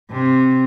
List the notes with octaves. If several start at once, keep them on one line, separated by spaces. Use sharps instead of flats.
C3